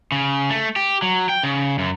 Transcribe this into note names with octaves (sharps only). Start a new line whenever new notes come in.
C#3
A3
G4
F#3
G5
C#3
F#2